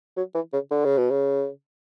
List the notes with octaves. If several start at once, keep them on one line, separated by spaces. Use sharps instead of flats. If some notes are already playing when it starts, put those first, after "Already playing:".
F#3
E3
C#3
D3
C#3
B2
C#3